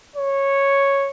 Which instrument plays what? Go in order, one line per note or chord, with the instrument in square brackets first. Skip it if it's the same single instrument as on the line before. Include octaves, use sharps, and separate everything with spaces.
[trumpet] C#5